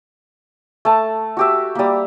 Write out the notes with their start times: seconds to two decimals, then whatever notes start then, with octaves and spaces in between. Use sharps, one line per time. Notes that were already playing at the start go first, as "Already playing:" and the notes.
0.85 A3 A5
1.37 F#4 G4 E5
1.75 G3 A#3